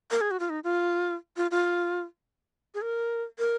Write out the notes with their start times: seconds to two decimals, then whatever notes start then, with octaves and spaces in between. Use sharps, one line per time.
0.11 A#4
0.21 G#4
0.31 F#4
0.40 F4
0.50 D#4
0.64 F4
1.37 F4
1.51 F4
2.74 G#4
2.82 A#4
3.39 A#4